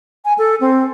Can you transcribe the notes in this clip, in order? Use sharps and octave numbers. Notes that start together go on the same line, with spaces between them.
G#5
A4
C4